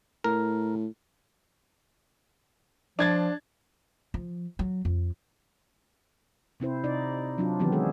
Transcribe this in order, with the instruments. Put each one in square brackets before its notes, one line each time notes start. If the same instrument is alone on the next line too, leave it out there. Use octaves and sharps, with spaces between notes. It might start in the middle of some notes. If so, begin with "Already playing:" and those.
[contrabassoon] A2 [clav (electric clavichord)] A#4
[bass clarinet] F3 [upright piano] D4 G#6 A6
[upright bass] F3
F#3
F2
[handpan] C3 C4 E4 C5
C3 D#4 D5
F#3 D4 F4
D#3 E3 F#3 B3 C4 G4
G#3 G#4 A4